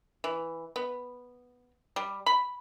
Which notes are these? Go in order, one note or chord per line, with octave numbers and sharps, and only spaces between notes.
E3
B3
G3
B5